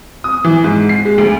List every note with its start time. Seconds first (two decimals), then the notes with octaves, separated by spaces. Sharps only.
0.24 D#6
0.44 E3
0.64 G#2
0.89 C7
1.05 G#3
1.18 D2